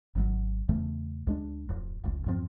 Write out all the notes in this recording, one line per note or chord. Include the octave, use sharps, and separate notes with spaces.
G#1 G#2 F3 F#3
E2 C#3 A3
D2 G#3 D4
D1 F2
F1 C#2
E2 G2 F3 C4